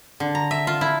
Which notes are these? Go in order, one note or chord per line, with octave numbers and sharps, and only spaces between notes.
D3
A#5
E5
F4
E4